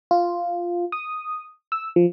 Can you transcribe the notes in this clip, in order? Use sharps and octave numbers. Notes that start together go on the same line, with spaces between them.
F4
D#6
E6
F3